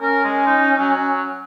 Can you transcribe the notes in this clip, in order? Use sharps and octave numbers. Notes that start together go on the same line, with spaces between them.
C#4 A#4
G#3
D#4
F#3